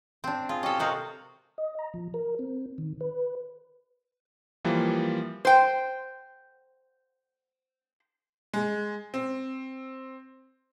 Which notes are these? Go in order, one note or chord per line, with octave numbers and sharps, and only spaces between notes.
C4 D4
F4 G#4
C#4 G4 A4 C#5 D#5
C3 F#4 A#4 D#5 F5 G5
D#5
A#5
F3
A#4
C4
D#3
B4
E3 F3 G3 A#3
C5 G5
G#3
C4